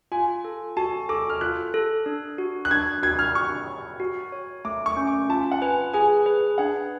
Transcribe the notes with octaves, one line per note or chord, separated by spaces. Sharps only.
F4 G#5
A4
F#4 A5
A4 D6
F6
F4 F#6
A4
D4
F#4
F#6
D4 G#6
F#4 G#6
F6
F#4 C#6
C#5
F#4
C#5
A3 D6
C#6
C#4
D6
F4 A5
F#5
B4 G#5
G#4 G#5
B4
D4 F#5